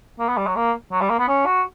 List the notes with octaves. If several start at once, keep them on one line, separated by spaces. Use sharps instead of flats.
A#3
B3
G3
F#3
A#3
F#3
G3
A#3
B3
C#4
F#4